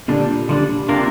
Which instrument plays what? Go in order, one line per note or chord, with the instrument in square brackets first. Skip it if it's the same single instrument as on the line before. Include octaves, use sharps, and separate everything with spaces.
[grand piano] A#2 [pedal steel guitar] D3 G3 D4
[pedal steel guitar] D3 G3 D4
[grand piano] C3 [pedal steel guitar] A#3 D4 F4 A#4